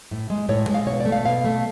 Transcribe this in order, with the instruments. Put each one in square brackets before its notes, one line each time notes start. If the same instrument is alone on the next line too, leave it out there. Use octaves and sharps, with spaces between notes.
[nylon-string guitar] A2
G#3
A2 C#5
G#3
F5
B2 C#5
D5
A3
F5
B2 F5
A3